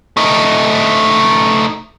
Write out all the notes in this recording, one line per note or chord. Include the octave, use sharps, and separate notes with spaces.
A3 D#4